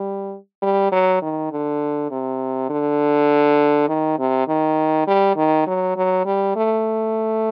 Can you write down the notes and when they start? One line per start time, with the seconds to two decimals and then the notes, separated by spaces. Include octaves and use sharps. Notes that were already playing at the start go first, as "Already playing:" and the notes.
Already playing: G3
0.62 G3
0.92 F#3
1.22 D#3
1.51 D3
2.11 C3
2.70 D3
3.88 D#3
4.19 C3
4.48 D#3
5.07 G3
5.36 D#3
5.67 F#3
5.96 F#3
6.25 G3
6.56 A3